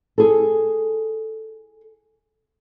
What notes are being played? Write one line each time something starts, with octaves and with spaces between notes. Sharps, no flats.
G#4 A4